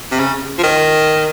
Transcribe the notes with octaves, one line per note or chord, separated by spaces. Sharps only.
C3
C#3
F3
D#3